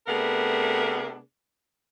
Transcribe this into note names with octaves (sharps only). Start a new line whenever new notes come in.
C3 A3 B3 D4 G#4 A#4